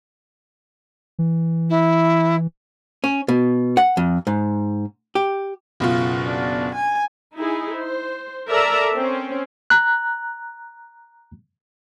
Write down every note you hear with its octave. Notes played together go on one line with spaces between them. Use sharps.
E3
E4
C#4
B2
F#5
F2
G#2
G4
F#1 B2 F4
D4
G#5
D#4 E4 G#4
C5
A4 A#4 D5 E5 A5 A#5
C4 C#4
A#5 F#6